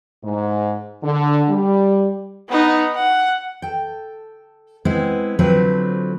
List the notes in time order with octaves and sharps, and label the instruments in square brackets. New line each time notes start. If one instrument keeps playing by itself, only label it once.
[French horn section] G#2
D3
G3
[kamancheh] B3 D#4
F#5
[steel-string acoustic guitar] A4 G5
G#3 B3 C4 E4
D3 F3 F#3 A3 C4 B4